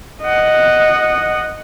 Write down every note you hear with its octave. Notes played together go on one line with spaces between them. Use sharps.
D#5 F#5